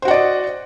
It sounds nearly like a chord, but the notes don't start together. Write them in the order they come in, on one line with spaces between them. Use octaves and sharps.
C5 F#4 F#5 D5 D#5